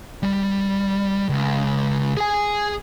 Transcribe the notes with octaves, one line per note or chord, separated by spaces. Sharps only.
G3
C#2
G#4 G#5